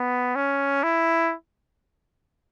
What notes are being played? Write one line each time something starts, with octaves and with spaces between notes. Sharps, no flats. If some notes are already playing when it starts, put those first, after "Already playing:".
Already playing: B3
C#4
E4